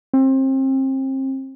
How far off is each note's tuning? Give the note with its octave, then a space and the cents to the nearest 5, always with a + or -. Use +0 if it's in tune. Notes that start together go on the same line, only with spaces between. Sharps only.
C4 +30